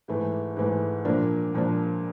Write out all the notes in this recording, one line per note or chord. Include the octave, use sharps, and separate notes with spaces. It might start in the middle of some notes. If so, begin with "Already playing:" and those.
G#2 E3 A3
G#2 E3 A3
A#2 F3 A#3 D4
A#2 F3 A#3 D4